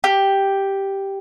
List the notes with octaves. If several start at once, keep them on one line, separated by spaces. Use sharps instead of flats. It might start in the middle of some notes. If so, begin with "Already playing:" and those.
G4